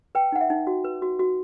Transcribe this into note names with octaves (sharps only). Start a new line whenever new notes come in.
B4 G5
D#4 F#5
E5
D#4
F#4
B4
F#4
F#4